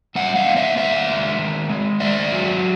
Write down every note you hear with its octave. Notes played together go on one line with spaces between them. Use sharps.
G3 E5 F#5
D#5 F5
A#3
D5 E5
D#3 D5 E5
G#3
D#3
G#3
D#3 D5 E5
F#3